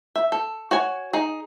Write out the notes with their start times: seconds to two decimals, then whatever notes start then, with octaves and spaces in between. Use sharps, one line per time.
0.16 E5
0.32 A4
0.71 F#4 C#5 G#5
1.13 D#4 G#4